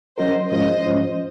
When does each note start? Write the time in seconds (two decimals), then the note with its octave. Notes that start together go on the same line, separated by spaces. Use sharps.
0.18 F#3 C#4 F#4 A#4 C5 D#5
0.51 G#2 F3 G#3 C#4 F4 C5 D#5
0.85 G#2 F3 G#3 C#4 F4